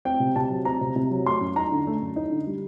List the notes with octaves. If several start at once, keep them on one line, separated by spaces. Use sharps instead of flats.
C4 G5
C3
C3 A5
F#3
C4 A#5
C3
C3
F#3
A3 C6
F#2
D#4 A#5
D3
A3
F#2
D#4
D3
G3